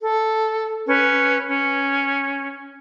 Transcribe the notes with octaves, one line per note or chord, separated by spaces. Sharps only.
A4
C#4 B4
C#4